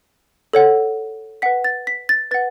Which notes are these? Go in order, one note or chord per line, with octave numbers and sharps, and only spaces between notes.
A4 C#5 F#5
B4 F#5 B6
A6
B6
A6
B4 F#5 A6